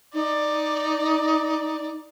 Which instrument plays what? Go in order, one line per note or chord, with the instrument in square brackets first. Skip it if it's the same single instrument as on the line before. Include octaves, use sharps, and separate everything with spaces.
[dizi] D#4 [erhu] D5